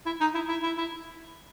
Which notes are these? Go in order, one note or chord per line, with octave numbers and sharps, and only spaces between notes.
E4
D#4
E4
E4
E4
E4